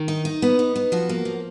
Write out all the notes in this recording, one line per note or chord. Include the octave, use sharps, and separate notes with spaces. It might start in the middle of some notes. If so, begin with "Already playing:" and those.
Already playing: D#3
D#4
D#4
B3
D#4
B3
F3 F#4
A#3
F3